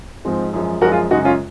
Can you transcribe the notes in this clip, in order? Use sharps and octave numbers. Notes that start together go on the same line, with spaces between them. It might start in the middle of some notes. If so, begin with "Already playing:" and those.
G#2 F3 G#3 C4
F#2 F3 G#3
F#2 F3 G#3 F#4 A#4
F4 G#4
F#2 C#3 G#3 D#4 F#4
C#4 F4